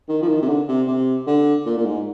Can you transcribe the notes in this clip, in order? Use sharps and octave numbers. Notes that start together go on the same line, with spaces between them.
D#3
F3
D#3
C3
D3
C3
C3
D3
A#2
A#2
G#2